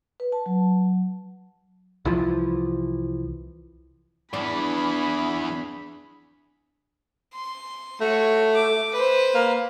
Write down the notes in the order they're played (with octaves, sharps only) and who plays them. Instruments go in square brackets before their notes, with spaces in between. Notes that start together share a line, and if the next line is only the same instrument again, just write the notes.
[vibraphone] B4
A5
F#3
[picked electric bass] C2 E3 F3
[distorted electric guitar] E2 E3 [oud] D4 [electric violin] G#4 B5
[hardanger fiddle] C6
[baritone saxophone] A3 [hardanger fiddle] F#4 C#5
[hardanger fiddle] D6
B4 C5
[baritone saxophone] A#3